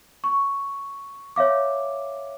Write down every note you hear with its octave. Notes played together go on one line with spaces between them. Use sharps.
C#6
C#5 E5 F5 D6